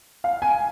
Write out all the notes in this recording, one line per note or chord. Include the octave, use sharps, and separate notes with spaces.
F5
G#5